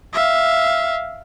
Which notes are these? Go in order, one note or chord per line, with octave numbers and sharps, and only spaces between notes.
E5 F5